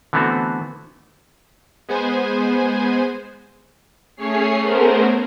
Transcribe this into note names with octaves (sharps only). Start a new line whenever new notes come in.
D3 E3 A3 B3 C4 F#4
G#3 B3 G#4 C5 G#5
A3 C#4 G#4 C#5 C7
A3 B3 C#4 G#4 A#4 C5